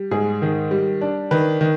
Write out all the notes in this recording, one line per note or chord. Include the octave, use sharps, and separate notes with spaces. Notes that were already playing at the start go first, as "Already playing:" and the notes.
Already playing: G3
G#2 G#4
D#3
G3
D4
D#3 B4
D#3